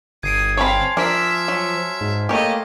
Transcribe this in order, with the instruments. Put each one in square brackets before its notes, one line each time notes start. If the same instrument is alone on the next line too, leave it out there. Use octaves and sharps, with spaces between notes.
[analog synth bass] G1 [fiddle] D#6 [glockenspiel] G#6 C7 D7
[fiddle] C4 F5 [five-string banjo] C#5 B5 [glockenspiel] G#5 A5 C6
[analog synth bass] F3 [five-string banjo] D4 A#4 [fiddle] E5 [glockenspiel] F6
[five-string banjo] F#3
[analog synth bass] G#2
[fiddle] A3 D#5 [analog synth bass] A#3 [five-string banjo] G4 C#5